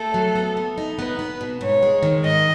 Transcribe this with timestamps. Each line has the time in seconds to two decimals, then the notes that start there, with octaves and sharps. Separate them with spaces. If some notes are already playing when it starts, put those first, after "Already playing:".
Already playing: A3 A4
0.14 F#3
0.35 B3
0.57 B3
0.78 D#4
0.98 B3 B4
1.19 B3
1.41 B2
1.61 G#2 C#5
1.83 G#3
2.03 D#3
2.24 G#2 D#5